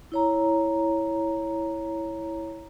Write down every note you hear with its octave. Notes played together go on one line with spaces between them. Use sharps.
E4 C#5 A#5